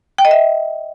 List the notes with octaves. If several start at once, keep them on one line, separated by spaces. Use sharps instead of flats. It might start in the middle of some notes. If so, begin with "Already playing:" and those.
G5
D#5
E5